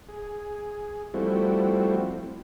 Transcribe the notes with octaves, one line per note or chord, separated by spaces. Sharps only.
G#4
F3 G3 A3 C4 E4 F#4